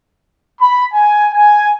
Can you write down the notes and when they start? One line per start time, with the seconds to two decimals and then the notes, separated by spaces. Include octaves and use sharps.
0.61 B5
0.93 G#5
1.33 G#5